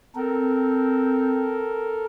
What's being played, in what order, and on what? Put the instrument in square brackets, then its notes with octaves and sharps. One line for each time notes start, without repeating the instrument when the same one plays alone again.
[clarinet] C4 [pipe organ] A4 A#4